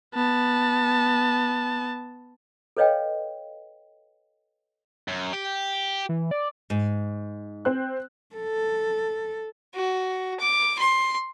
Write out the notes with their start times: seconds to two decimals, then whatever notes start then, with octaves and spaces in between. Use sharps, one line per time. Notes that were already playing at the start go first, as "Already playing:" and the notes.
0.15 B3 A5
2.77 A4 B4 C#5 D#5 F5 G5
5.08 F#2
5.33 G4
6.09 E3
6.31 D5
6.70 G#2
7.65 C4 C5 F#6
8.36 A4
9.75 F#4
10.40 D6
10.78 C6